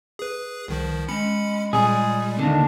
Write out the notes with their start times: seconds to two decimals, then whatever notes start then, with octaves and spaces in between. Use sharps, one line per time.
0.19 G#4 B4
0.68 C2 D#3 F3
1.08 G#3 C#4 B5 C#7
1.73 A#2 G3 G#4
2.39 D#2 D3 D4